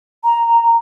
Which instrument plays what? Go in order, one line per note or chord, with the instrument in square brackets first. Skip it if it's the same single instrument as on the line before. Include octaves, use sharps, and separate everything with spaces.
[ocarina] A#5